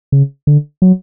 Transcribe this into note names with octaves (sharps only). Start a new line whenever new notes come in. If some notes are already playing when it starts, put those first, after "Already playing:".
C#3
D3
F#3